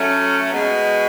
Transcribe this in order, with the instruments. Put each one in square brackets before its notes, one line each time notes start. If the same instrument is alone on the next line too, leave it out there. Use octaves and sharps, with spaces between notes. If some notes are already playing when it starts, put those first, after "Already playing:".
Already playing: [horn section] F#3 A3 C#4
B2 G#3 B3